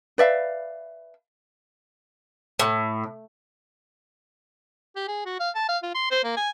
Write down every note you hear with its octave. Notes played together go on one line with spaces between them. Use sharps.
B4 D5 E5 F5
A2
G4
G#4
F#4
F5
A5
F5
F4
C6
C5
A#3
G#5